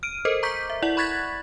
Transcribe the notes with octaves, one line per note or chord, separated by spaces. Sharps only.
F6 D7 D#7
A4 A#4 C5 D#5
A#5 C#6 D6 G6 B6
E5
E4 D5 F#5 F#7
B5 C#6 F#6 G#6 A6 B6